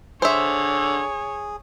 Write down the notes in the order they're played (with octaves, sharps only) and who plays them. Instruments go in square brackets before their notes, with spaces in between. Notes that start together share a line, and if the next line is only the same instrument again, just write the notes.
[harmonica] D3 [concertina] G#4 [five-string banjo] C5 E5 [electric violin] C#5